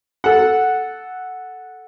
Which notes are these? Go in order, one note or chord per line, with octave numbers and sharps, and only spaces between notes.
A4 F#5